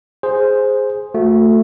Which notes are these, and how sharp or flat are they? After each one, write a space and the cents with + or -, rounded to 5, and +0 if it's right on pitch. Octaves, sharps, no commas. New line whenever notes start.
G#4 +0 C5 +0
A3 +10 F#4 -35